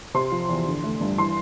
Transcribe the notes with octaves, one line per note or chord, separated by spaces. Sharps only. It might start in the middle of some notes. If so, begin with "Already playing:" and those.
C3 C6
F3
E2
D3
A3
G2
E3 C6